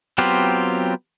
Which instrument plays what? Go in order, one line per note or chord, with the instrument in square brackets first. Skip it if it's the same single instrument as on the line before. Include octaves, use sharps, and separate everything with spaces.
[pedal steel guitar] F#3 B3 C4 F4 G4